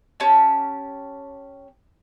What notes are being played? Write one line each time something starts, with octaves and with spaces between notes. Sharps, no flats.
C#4 G4 A5